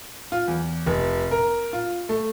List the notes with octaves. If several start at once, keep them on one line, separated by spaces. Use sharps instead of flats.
F4
E2
F1
A#4
F4
A3